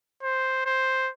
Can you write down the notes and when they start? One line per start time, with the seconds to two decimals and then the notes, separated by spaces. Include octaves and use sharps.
0.23 C5
0.65 C5